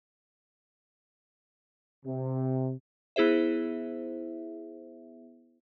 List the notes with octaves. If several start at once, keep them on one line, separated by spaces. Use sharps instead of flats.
C3
B3 E4 G#4 C5 E5